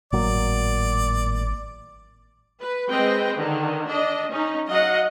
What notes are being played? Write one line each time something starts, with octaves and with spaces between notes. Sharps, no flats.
G#1 A2 F#3 A#3 D5
B4
G#3 C4 B4 D#5 G5
D3 D#3
D4 D#5
C#4 D#4
F#3 D#5 F5 F#5